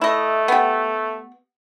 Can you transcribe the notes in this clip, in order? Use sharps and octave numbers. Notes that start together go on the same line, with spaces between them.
A3 E4 D#5
B3 G4